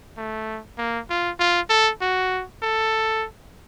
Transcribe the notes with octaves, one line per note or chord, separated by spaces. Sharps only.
A3
A#3
F4
F4
A4
F#4
A4